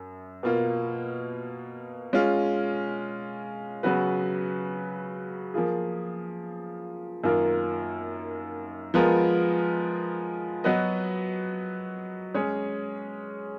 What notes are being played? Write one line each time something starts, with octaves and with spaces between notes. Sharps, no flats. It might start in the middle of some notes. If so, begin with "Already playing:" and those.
Already playing: F#2
B2 A#3 F4
G#3 C#4 F4
C#3 F#3 B3 F#4 B4
F3 A#3 F4 G#4
F#2 D#3 A#3 F4 A#4
F3 G#3 B3 F4 A#4
F#3 B3 F#4 B4 D#5
G#3 C#4 G#4 C#5